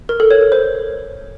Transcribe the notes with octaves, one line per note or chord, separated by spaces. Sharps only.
A#4
A4
C#5
A#4
C5